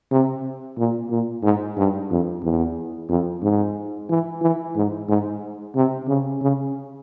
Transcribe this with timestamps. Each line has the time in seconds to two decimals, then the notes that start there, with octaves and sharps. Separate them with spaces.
0.11 C3
0.77 A#2
1.10 A#2
1.43 G#2
1.77 G2
2.11 F2
2.43 E2
3.09 F2
3.43 G#2
4.10 E3
4.42 E3
4.76 G#2
5.09 G#2
5.75 C3
6.08 C#3
6.42 C#3